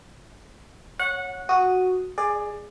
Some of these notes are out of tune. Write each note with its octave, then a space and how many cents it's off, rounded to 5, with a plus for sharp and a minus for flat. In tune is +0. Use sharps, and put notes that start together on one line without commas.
C#5 -5 F#5 -20
F#4 -5 D#6 +0
G#4 +0 D5 +20